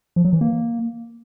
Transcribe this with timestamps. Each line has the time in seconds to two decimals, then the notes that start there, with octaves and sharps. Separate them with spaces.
0.16 F3
0.25 F#3
0.33 E3
0.41 A#3